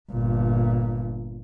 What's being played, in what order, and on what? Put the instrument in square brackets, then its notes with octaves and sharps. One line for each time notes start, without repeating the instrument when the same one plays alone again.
[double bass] G1 A#2